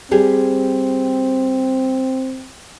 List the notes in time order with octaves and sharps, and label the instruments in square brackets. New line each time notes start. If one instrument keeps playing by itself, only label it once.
[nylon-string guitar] G3 G4 G#4 [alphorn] C4